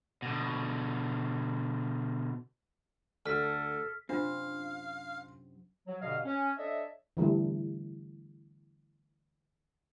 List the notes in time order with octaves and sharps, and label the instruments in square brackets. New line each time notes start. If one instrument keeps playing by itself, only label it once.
[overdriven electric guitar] B2 D3
[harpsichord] D2 [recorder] A4 [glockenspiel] F6 B6
[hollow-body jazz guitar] F#2 C3 C4 [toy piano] D4 F4 [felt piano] C5 [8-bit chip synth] F5
[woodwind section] F#3
G2 B2 D3 D#5 F5
C#4
D4 A4 C#5 D#5 E5
[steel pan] D3 E3 G3 A3